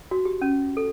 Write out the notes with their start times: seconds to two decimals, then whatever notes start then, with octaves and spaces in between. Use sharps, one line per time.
0.11 F#4
0.25 G4
0.41 C#4
0.77 A4